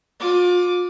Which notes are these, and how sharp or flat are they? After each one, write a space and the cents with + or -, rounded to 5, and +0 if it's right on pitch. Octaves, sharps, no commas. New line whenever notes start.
F4 +35 D6 -5